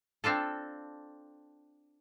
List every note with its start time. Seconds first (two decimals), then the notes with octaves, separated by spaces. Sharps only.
0.24 C4 D4 F4 A4